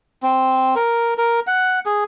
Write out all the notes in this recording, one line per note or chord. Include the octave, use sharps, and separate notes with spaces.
C4
A#4
A#4
F#5
G#4